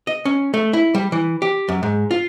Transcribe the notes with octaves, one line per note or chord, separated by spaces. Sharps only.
D#5
C#4
A3
E4
G3
E3
G4
F#2
G#2
F4